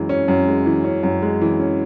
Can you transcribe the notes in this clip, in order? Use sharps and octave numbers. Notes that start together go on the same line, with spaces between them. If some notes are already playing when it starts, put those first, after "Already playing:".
Already playing: F#2 E3 G#3
C#4
F#2
G#3
E3
C#4
F#2
G#3
E3
C#4